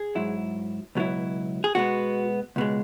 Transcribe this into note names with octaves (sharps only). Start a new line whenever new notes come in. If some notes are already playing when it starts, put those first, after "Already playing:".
Already playing: G#4
G#2 F#3 E4
C#2 B2 F#3 E4
G#4
B2 G#3 B3 F#4
C#2 B2 G#3